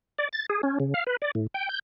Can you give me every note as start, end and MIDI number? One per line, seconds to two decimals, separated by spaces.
0.18 0.29 74
0.33 0.46 93
0.50 0.61 68
0.63 0.78 61
0.80 0.94 49
0.94 1.04 77
1.07 1.17 71
1.22 1.31 74
1.35 1.47 45
1.54 1.69 79
1.69 1.79 91